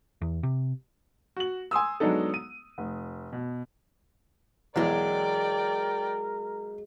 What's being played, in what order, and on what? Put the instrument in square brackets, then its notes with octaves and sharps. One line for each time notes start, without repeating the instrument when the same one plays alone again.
[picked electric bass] E2
C3
[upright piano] F#4 F#7
G#5 C6 D#6 E6
F#3 G#3 B3 D4 D#4 A4
D#7
F1
B2
[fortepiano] B1 E2 E3 [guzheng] F#3 G#3 [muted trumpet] A#4 [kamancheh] D5 G5